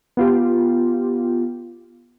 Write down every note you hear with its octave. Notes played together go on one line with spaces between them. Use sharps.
B3 F4 G4